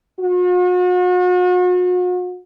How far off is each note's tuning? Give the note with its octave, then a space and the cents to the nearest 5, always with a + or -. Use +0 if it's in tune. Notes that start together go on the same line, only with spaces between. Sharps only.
F#4 -40